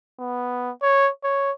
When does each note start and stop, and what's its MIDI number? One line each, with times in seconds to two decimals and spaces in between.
0.20 0.72 59
0.82 1.10 73
1.24 1.52 73